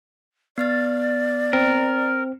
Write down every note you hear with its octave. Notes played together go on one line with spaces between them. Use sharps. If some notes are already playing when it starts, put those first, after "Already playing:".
B3 D5 F6 A6
C4 A#4